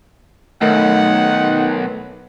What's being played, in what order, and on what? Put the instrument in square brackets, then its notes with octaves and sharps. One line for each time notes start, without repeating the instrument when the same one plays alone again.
[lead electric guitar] B1 [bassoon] D#3 [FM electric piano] A3 [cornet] F#5